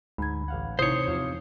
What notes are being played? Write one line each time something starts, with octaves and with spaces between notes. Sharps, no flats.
D2 G#2 B5 G#6
A1 F5 F#5
C3 D#4 E4 C5 C#5 D#6
E2 C3 F3